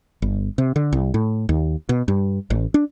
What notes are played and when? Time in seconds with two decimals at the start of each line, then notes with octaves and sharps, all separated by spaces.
0.22 G1
0.58 C3
0.76 D3
0.93 C2
1.14 A2
1.49 D#2
1.89 B2
2.08 G2
2.50 A1
2.74 D4